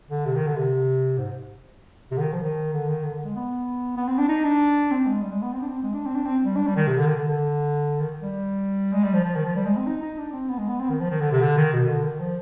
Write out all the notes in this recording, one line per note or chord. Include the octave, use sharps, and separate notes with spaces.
D3
C3
D#3
D3
C3
G#2
C3
D3
D#3
F3
D#3
D3
D#3
D3
D3
G#3
B3
B3
C4
D4
D#4
D4
C4
G#3
G3
G#3
B3
C4
D4
C4
G#3
D4
C4
D4
C4
G3
D4
G3
D#3
C3
D3
D#3
D3
D3
D#3
G3
G#3
G3
F3
F3
D#3
F3
G3
G#3
C4
D#4
D#4
D4
C4
B3
G#3
B3
C4
D#3
F3
D#3
D3
C3
D3
D#3
B2
D3
D#3
F3